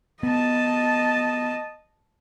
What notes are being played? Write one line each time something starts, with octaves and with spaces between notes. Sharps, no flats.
B3 D#5 A5